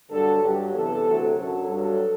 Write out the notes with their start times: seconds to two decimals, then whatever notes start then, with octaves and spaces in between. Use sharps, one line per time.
0.11 G2 D3 F#3 A4
0.42 G2 F#3 G4
0.74 E2 C3 E3 A4
1.06 D2 C3 F#3
1.37 F#2 D3 F#3 A4
1.68 G2 F#3 A4